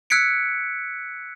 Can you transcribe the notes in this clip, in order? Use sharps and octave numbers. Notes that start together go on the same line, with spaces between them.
E6 F#6 G#6 B6 C#7 D7